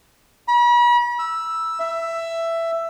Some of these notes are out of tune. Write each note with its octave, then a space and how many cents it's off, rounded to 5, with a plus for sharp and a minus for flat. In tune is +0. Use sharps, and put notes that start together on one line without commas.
B5 -45
E6 +0
E5 +10